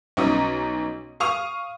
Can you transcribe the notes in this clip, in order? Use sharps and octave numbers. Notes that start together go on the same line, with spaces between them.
B1 C#4 D#4 A#5 D#6
F5 C#6 D#6 F7